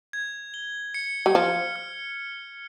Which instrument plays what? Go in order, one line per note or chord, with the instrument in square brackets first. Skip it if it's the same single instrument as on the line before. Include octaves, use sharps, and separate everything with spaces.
[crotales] G#6
G7
C#7
[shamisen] G3
[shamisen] F3 [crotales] F6
[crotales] F6